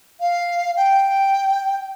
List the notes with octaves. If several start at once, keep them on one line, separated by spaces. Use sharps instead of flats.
F5
G5